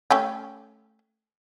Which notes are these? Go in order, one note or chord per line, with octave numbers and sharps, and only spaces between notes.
A3 C#4 G4